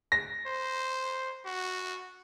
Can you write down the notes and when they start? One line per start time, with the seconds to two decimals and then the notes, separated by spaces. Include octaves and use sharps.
0.12 A#6
0.46 C5
1.45 F#4